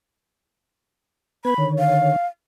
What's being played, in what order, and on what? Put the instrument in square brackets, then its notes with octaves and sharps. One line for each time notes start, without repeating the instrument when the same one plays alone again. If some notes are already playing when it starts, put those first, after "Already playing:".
[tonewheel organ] B3 B4 G#6 [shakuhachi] B5
[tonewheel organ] D3 D#3 C#5
[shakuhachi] F5